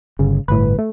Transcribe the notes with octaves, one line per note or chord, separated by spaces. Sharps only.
G1 C#3
G1 A2 B4
A3